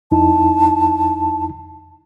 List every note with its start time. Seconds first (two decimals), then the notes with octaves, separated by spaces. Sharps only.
0.12 F2 D#4 E4 A5